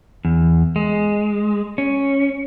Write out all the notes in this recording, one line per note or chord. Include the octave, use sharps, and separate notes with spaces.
E2
G#3
C#4